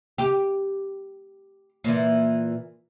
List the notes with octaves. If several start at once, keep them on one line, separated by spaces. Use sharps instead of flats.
G4
A#2 E3